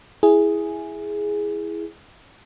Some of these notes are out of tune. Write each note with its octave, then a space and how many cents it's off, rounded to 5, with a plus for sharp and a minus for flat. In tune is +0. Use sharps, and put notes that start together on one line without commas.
E4 +0 G#4 +0